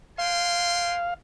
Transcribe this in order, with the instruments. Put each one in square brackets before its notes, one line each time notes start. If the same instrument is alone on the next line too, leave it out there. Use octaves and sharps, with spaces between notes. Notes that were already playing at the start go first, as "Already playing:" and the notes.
[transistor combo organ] F5 [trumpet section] G5 G#5 C6